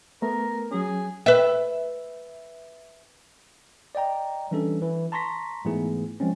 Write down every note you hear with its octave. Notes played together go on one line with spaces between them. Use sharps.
A3 B3 A#4
F#3 C#4 G#4
B4 E5
D5 D#5 G5 A#5
E3 G3 C#4 D4 A4
E3
A5 A#5 C6 C#6 A#6 B6
G#2 E3 A3 B3 E4 G#4
F3 G#3 C4 C#4